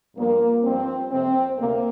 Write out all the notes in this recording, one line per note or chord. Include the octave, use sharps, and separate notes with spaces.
G2 F3 A#3
G2 F3 C4
F2 C3 F3 C4
D2 C3 A#3